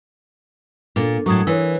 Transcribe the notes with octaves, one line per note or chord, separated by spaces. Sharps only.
A#2 D4 A4 A#4
A2 F#3 C#6 D#6 G#6
E3 E4 A#4 C#5